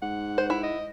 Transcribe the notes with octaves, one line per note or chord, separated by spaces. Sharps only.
G#2 F#5
C5
E4
D#5